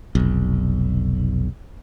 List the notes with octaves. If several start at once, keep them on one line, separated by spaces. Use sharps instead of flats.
F1 B1